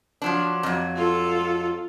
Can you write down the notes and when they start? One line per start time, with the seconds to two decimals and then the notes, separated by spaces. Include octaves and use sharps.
0.22 F3 F#3 D4
0.63 F2 F#3
0.96 F4 A4